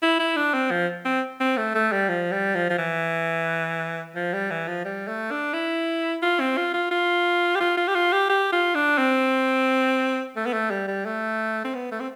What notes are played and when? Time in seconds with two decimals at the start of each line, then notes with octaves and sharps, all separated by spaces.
0.02 E4
0.19 E4
0.36 D4
0.54 C4
0.71 F3
1.05 C4
1.40 C4
1.57 A3
1.75 A3
1.92 G3
2.09 F3
2.32 G3
2.55 F3
2.70 F3
2.78 E3
4.15 F3
4.33 G3
4.51 E3
4.68 F3
4.85 G3
5.08 A3
5.31 D4
5.53 E4
6.22 F4
6.40 C4
6.57 F4
6.74 F4
6.91 F4
7.55 G4
7.60 F4
7.77 F4
7.88 G4
7.95 F4
8.12 G4
8.29 G4
8.52 F4
8.75 D4
8.98 C4
10.36 A3
10.46 B3
10.53 A3
10.71 G3
10.88 G3
11.06 A3
11.64 C4
11.75 B3
11.91 A3
12.00 C4